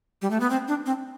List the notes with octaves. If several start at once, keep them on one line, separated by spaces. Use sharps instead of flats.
G3
A3
B3
C4
D4
C4